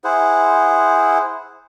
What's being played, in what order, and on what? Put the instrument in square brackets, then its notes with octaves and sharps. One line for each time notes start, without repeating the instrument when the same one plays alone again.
[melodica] E4 G#4 C5 F#5